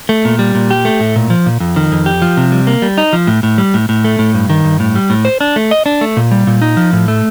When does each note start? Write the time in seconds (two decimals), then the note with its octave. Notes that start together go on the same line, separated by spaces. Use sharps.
0.09 A3
0.25 A#2
0.39 G3
0.55 A#2
0.71 G4
0.85 A3
1.00 A2
1.16 A#2
1.30 F3
1.46 A#2
1.60 F2
1.76 D#3
1.92 F2
2.06 G4
2.22 F3
2.37 C3
2.52 G3
2.67 A#3
2.82 G3
2.98 D#4
3.13 F3
3.27 A2
3.43 A2
3.58 G3
3.74 A2
3.89 A2
4.05 A3
4.19 A2
4.35 G2
4.50 D#3
4.65 G2
4.80 A2
4.95 G3
5.10 A2
5.25 C5
5.41 D4
5.56 A3
5.71 D#5
5.86 D4
6.01 A3
6.17 A#2
6.31 G3
6.47 A#2
6.62 D#4
6.77 F3
6.93 A2
7.08 A3